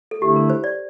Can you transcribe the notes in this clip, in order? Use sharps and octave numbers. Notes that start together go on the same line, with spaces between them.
A4
D3 A3 E4 G4
A#4
C5
D5